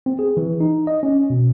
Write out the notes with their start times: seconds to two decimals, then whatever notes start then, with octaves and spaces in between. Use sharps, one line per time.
0.06 C4
0.19 G#4
0.37 E3
0.60 D#4
0.87 D#5
1.03 C#4
1.30 B2